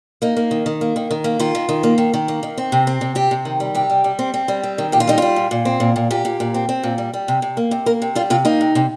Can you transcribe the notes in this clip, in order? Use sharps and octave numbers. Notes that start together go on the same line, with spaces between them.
A#3 D#4
A#3
D#3
D#3
A#3
D#3
D#3
A#3
D#3 F4
D#3
D#3
A#3
D#3
D#3
A#3
D#3
C4
C3
C4
C3
C4 G4
C3
D#3
G3
C3 G4
G3
G3
C4
C4
G3
C4
D#3
A#2 G4
F4
G3 D#4
G3 F4
A#2
A#2
C4
A#2
A#2
A#2 G4
A#2
A#2
C4
C4
A#2
G3
G3
C3
C3
A#3
C3
A#3 A#4
C3
G3 F4
C3 F4
A#3 D#4
C3
C3